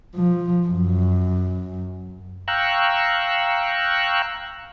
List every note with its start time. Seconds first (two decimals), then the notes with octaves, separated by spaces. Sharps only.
0.15 F3
0.67 F#2
2.48 F5 G5 A#5 C#6 E6 F#6